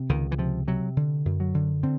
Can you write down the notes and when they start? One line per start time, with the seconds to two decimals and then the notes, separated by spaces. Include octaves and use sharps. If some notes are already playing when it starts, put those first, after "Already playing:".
Already playing: C3
0.09 C#2 D#3
0.32 E3
0.38 C3 F3
0.68 C3 F#3
0.97 D3
1.25 F#2
1.40 F#3
1.54 D3
1.83 D3 C4